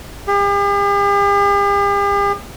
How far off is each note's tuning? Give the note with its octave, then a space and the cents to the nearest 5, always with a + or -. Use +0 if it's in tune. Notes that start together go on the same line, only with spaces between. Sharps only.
G4 +45